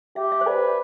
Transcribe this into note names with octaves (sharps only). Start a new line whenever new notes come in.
G4 E5
E5
C5
B4 D5